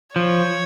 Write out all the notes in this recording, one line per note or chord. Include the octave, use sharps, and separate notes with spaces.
F3 C#5